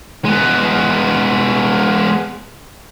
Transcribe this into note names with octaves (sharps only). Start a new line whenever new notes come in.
G#3 B3